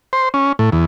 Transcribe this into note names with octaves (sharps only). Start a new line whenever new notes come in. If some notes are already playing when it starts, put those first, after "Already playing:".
C5
C#4
A2
E2